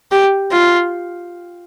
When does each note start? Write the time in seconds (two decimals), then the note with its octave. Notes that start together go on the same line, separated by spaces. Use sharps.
0.12 G4
0.52 F4